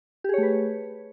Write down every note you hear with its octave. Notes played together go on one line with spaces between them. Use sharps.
A3 G4 G#4 B4 C#5